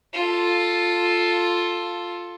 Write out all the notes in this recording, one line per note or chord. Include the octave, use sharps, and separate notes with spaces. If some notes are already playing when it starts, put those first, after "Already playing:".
F4 A4